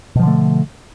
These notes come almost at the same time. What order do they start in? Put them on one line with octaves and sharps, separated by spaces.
B2 F3 D3 A3